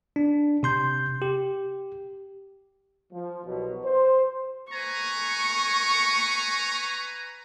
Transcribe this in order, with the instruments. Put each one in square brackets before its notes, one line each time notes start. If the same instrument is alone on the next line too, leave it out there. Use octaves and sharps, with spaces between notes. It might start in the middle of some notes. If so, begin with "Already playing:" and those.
[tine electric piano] D4
C3 C6 G6
G4
[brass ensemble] F3
C2 B2 F#3
C5
[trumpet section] B4 G#5 A#5 [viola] C#6